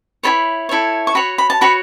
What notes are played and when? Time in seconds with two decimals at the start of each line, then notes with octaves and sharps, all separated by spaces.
0.23 E4 A4 C#5 B5
0.69 E4 A4 C#5
1.07 C#6
1.15 F#4 C#5 B5
1.38 B5
1.50 A5
1.61 F#4 C#5 B5